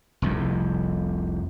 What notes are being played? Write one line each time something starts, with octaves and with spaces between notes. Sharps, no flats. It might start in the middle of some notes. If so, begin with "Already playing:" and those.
F1 C2 F2